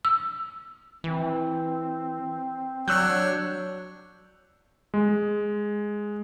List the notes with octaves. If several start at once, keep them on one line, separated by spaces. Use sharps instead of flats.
E6
E3 C4
F#3 D4 C#5 E6 F#6 G6
G#3